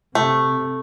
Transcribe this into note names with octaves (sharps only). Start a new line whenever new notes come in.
C3 A3